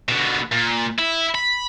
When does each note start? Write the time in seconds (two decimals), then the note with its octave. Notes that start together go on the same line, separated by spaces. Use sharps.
0.09 B2 D3
0.52 A#2
0.99 E4
1.35 B5